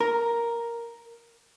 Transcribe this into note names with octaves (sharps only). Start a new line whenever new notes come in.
A#4